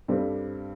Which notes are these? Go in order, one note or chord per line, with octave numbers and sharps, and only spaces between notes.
G2 G3 C4 A4 C5